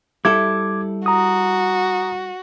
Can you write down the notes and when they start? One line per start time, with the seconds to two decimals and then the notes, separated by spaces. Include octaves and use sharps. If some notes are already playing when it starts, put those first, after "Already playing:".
0.25 G3 E4 A4 D6 G#6
1.06 F#4 A#5 D#6